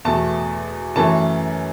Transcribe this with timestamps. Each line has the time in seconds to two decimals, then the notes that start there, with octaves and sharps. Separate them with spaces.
0.05 E2 B2 A3 A5
0.96 F#2 E3 A3 A5